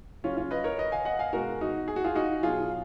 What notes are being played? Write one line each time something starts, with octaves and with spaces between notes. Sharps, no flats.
C#3 F#3 C#4 F4
C#4 F4
B4 D#5
A#4 C#5
B4 D#5
F5 G#5
D#5 F#5
F5 G#5
B2 G#3 F#4 A#4
D#4 F#4
G#4
F#4
F4 G#4
D#4 F#4
B2 F#3 F4 G#4